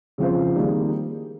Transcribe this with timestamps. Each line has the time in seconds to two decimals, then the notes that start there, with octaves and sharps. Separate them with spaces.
0.18 C#3 F3 C4 F4 C5
0.56 D#3 G3 A#3 D#4 G#4